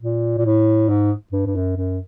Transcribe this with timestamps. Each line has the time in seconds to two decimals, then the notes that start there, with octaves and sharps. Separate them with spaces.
0.02 A#2
0.38 A#2
0.46 A2
0.89 G#2
1.32 G2
1.46 G2
1.55 F#2
1.77 F#2